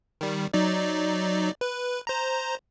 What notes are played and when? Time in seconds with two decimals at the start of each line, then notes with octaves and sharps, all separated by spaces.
0.21 D#3 G3
0.53 F#3 D#4 D5
1.61 B4
2.07 C5 A#5